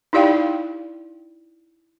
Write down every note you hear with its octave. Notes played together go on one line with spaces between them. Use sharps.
D#4 E4 G4 D5 F5 G5